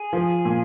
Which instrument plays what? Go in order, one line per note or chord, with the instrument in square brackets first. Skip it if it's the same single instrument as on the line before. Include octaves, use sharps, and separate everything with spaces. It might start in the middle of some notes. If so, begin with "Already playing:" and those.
Already playing: [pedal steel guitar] G#4
[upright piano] F3
A#2